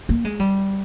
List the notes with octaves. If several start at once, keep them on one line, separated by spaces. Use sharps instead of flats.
A#3
G#3
G3